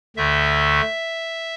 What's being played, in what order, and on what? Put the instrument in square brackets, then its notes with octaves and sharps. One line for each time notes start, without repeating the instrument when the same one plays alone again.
[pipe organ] D2 D3 A3 E5